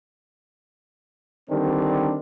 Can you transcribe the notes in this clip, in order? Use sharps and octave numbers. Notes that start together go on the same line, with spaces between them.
D3 D#3 G3 C4 D4